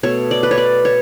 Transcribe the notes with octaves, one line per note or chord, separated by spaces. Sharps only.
B2 A3 C#5
D5
B4
C#5
D5
C#5